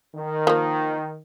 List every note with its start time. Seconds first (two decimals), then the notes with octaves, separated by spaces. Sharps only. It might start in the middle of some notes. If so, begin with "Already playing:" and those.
0.15 D#3
0.47 F3 A#3